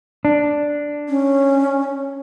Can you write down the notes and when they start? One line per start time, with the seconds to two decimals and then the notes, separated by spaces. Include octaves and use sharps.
0.25 D4
1.09 C#4